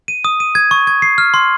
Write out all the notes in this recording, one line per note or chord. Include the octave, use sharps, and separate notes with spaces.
D#7
D#6
D#7
G#6
C#6
G#6
C7
F6
C6